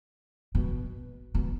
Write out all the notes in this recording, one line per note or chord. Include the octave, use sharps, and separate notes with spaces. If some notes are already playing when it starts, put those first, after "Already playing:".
B2
B2